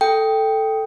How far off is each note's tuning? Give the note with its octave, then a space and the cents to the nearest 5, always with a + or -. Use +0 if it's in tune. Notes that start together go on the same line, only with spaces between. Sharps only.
A4 +0 G5 +0